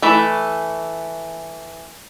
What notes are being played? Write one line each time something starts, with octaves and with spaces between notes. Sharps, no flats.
E3 A3